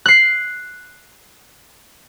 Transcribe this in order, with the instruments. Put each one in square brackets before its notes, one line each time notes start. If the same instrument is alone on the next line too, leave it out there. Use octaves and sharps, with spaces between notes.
[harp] F#6 C7